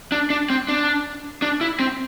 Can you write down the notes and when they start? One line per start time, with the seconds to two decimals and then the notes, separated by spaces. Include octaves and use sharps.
0.12 D4
0.30 D4
0.50 C4
0.68 D4
1.42 D4
1.61 E4
1.80 C4